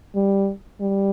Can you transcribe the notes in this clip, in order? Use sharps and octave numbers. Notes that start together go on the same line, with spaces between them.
G3
G3